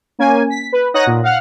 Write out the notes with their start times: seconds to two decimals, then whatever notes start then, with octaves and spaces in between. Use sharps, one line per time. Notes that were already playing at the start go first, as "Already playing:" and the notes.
0.19 A#3 C#4 G#5
0.50 B6
0.72 B4
0.94 D#4 C#5 F#5 D#6 F#6 A#6
1.07 A#2
1.23 F5 F#5 F6